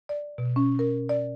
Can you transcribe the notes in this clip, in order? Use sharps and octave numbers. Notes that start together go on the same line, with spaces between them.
D5
B2
C#4
A#4
D5